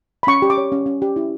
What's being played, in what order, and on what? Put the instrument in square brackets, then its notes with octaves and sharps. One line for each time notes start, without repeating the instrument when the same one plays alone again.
[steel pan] B5
C#4 C#6
G4
D6
C#5
C#4
C#4
G4
E4